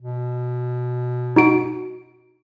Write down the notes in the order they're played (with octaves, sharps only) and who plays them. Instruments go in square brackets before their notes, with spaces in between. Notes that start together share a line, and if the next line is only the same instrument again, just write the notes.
[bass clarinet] B2
[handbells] D#4 F#4 D7